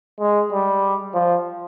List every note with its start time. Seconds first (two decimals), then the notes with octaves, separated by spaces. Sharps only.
0.20 G#3
0.52 G3
1.14 F3